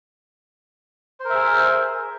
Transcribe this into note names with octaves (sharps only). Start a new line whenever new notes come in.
G#4 A#4 C5 E5